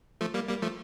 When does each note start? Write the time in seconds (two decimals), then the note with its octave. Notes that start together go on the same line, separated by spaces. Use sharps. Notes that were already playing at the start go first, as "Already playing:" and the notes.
0.21 F3 A3
0.34 G3 A#3
0.49 G3 A#3
0.62 F3 A3